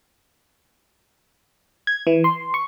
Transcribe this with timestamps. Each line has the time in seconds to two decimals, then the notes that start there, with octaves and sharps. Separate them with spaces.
1.87 G#6
2.07 E3
2.24 C6
2.54 C#6